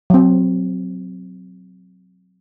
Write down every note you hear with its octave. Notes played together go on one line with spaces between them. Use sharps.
F#3 C4